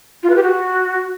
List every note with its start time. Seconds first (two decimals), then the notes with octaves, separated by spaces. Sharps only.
0.23 F4
0.30 B4
0.36 G4
0.43 F#4